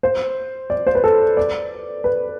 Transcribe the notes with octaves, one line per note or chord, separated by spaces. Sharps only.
C5
D5
C5
B4
A4
D5
B4